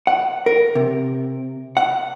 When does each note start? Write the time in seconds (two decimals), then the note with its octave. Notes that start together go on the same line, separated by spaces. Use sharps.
0.07 F#5
0.46 A#4
0.75 C3
1.77 F#5